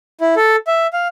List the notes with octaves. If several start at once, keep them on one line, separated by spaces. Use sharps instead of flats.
E4
A4
E5
F5